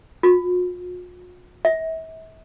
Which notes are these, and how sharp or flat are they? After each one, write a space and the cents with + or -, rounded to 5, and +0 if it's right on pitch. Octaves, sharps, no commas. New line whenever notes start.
F4 +45
E5 -35